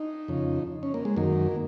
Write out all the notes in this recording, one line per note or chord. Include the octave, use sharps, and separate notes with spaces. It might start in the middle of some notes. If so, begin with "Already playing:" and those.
Already playing: D#4
F2 C#3
C#4
A#3
G#3
F#2 D#3 A#3